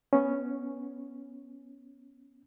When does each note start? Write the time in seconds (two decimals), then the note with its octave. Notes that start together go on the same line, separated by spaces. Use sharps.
0.13 B3 C#4